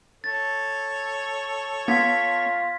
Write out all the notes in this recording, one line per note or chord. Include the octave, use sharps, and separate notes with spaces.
A4 C#5 A6
B3 F4 G#6 B6